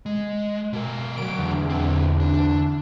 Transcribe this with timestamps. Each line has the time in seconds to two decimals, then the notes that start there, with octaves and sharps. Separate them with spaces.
0.06 G#3
0.73 B2 A#4
1.18 D2 F#3 D7
1.39 E2 D3
1.70 A#2 C4
2.20 D4